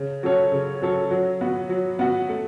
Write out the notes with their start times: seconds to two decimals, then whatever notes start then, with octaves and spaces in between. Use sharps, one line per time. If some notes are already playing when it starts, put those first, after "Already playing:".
Already playing: C#3
0.23 F#3 C#4 A4 C#5
0.52 C#3
0.82 F#3 C#4 A4 C#5
1.11 F#3
1.41 B3 F#4
1.69 F#3
1.99 B3 F#4
2.29 A3